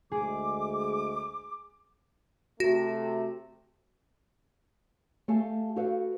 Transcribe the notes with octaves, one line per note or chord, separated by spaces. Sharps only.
D2 G#3 G#4 D6
C3 A3 F#4
A3 G4 A4 F5 G#5 A5
F#4 G4 A4 B4 F5